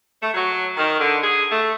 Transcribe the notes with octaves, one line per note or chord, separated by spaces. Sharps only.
A3
F#3
D#3
D3
G#4
A3